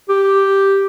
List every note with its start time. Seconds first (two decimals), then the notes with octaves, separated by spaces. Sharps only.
0.09 G4